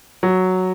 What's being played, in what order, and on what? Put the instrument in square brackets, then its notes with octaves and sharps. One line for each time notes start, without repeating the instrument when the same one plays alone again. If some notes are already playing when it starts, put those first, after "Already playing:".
[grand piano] F#3